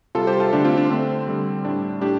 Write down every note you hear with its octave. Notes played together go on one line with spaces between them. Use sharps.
C3 G3 F4 A4
G4 C5
F4 A4
D3 A3 D4 G4
C4 F4
D4
D3 A3 C4
D3 G3
A2 G3 D4
A2 D4 G4